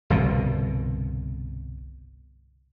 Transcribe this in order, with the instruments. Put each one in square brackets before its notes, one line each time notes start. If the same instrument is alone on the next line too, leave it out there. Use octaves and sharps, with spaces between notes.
[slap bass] G1 C2 B2